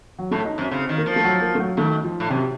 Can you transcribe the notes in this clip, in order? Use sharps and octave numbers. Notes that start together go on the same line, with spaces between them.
F#3
A2 A3
D#4
F#2 C4
C#3 C4
D#3
A#3
F3
A3
F#3
A#3
A3
F#3
D#3 A3
F3
A2
F#2 C3